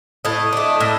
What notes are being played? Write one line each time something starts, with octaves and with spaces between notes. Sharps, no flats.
A2 D#5
A3 D4
A2